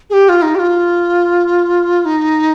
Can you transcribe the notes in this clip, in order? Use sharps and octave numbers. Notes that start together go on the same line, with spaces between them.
G#4
G4
F4
D#4
G4
F4
D#4